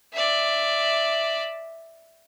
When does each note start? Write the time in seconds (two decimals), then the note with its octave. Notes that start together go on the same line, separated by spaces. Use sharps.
0.13 D5 E5